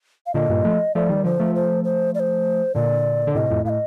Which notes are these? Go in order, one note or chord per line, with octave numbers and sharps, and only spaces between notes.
F5
A#2 D3 D#5
G2 A#2
F3 A3
F3 A3 D5
D#3 G3
D3 F3 C5
F3 A3
C5
C5
D5
C5
A#2 D3 D5
D3
A2 C3 D#5
F2 A2
A2 D#5 F5